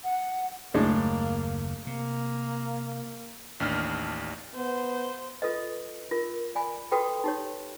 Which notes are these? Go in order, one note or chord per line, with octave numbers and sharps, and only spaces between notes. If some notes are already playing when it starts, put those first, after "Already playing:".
F#5
F#1 D#2 A2 G#3 A#3 D4
C3 A#3
A1 D#2 D4 F6
B3 C5
F4 A4 B4 D#5
F4 A#4
D5 G#5 B5
F#4 A4 B4 G5 B5
D#4 G4 C#5